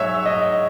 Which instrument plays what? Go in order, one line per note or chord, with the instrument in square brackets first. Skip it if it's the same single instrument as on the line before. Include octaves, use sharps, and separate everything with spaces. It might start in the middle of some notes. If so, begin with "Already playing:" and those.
Already playing: [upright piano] G#2 F#3 C#5 E5
D#5